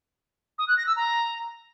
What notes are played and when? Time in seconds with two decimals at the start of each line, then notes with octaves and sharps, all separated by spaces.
0.58 D#6
0.68 F#6
0.77 A#6
0.87 E6
0.96 A#5